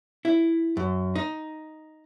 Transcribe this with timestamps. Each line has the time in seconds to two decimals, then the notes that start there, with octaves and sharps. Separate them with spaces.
0.25 E4
0.77 F#2
1.15 D#4